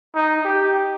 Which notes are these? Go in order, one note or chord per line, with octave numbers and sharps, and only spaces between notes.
D#4
G4